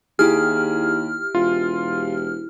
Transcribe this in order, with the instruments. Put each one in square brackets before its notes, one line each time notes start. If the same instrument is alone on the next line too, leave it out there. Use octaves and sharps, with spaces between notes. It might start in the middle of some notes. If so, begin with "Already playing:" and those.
[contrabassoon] D#2 [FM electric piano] E4 G4 [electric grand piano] G#4 [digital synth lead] F6
[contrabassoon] E1 [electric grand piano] F4